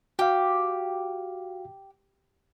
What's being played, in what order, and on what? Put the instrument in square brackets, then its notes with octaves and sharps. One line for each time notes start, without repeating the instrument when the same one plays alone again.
[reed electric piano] F#4 F5 [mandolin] G4